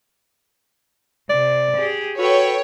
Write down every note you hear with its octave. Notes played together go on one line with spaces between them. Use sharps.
C3 D5
G4 G#4
F#4 A4 B4 C#5 G5